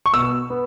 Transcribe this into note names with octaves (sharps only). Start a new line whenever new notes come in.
C#6
B2 E6
B3